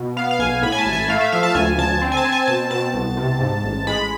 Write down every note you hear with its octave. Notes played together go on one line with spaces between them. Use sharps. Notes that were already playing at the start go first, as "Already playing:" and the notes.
Already playing: B2
B3 F5
F5
B1 G#5
A2 B5
G#5
A5
A1
G#5
A3 F5
E5
F3 F5
A5
D2 G#5
D2 A5
C4
G#5
A5
C4
G#5
B2 A5
B2 A5
C2
C3
G#2
A1
G#3 B5